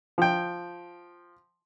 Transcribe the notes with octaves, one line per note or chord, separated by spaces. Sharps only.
F3 G5